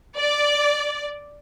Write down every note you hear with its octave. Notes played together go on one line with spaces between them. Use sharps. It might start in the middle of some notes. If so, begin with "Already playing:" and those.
D5